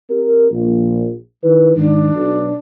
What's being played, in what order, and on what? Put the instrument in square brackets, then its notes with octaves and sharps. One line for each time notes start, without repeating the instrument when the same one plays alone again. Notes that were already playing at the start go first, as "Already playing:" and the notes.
[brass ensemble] C4 G4 A#4
A#1
D#3 E4 B4
[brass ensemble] G#2 D#3 [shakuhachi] D4
[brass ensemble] B1